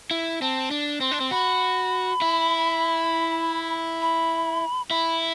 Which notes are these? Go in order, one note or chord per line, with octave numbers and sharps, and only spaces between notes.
E4
C4 A5
D4
C4 C6
D4
C4
F#4 B5
E4
B5
E4 B5